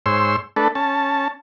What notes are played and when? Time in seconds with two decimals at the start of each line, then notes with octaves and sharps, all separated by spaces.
0.06 G#2 C5 C#5 C6 E6
0.56 A3 D4 A4 B4
0.75 C#4 A5